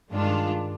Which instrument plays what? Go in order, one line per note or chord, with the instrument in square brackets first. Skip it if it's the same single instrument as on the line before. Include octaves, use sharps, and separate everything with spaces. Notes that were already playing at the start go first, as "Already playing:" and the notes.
[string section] G2 D#3 G#3 D4 F4